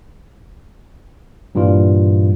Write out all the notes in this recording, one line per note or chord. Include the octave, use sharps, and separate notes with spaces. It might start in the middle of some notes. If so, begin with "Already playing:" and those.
G2 A#2 E3 G3 F4